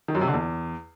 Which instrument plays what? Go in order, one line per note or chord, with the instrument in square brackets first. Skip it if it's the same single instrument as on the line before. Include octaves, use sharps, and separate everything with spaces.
[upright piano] D#3
F#2
C3
D3
E2